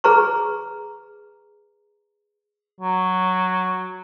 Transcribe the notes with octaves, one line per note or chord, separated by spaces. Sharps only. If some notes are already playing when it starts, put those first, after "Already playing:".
G#4 B4 A#5 C#6
F#3